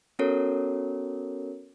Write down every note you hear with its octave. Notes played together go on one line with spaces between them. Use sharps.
B3 C#4 F#4 A4 A#4 C#5